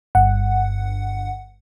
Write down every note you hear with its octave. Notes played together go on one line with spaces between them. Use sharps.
G1 G2 F#5